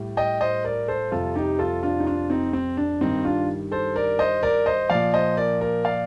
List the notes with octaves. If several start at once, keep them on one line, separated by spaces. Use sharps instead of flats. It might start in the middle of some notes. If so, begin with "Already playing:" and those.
Already playing: A2 G3
D#5 G5
C5 D#5
A#4 D5
A4 C5
F2 C3 G3 F4 A4
D#4 G4
F4 A4
D4 F4
D#4
D4 F4
C4 D#4
C4
D4
G2 D#3 G3 C4 D#4
D4 F4
A4 C5
A#4 D5
C5 D#5
A#4 D5
C5 D#5
A#2 F3 D5 F5
C5 D#5
A#4 D5
A#4 D5
D5 F5